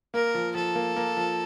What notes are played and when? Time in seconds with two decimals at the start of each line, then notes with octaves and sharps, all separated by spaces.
0.14 A#3 A#4
0.35 F3
0.55 F3 A4
0.75 A#3
0.96 A#3
1.17 F3